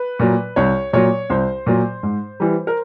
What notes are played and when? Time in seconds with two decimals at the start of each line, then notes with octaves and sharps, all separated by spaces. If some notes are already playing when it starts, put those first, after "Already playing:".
Already playing: B4
0.19 A#2 F#3
0.56 C2 C#5
0.93 A#2 F#3 C#5
1.30 C2 C5
1.66 A#2 F#3
2.03 G#2
2.40 E3 G3
2.67 A#4